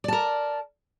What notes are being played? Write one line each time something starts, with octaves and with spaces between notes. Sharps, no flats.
A#4 D5 A5